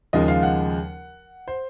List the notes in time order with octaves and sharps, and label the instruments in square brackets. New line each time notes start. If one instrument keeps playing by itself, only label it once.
[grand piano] D#2 C#3 F3 G#3 D#5
F5
F#5
C5